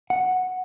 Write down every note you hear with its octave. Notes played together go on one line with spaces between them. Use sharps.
F#5